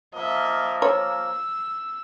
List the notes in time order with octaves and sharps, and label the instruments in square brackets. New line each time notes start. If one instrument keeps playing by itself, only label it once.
[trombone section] F3 A#3 [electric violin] D#5 E5
[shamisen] C#5 [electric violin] E6